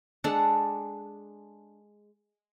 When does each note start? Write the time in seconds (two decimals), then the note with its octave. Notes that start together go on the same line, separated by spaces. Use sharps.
0.24 G#3 D4 A4 F#5